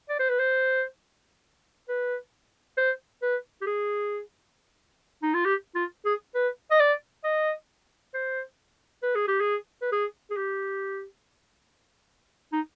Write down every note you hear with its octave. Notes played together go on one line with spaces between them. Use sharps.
D5
C5
B4
C5
B4
C5
B4
G4
G#4
D#4
F4
G4
F4
G#4
B4
D#5
D5
D#5
C5
B4
G#4
G4
G#4
B4
G#4
G#4
G4
D#4